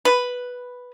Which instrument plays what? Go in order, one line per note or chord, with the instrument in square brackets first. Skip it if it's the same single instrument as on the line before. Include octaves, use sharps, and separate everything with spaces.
[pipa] B4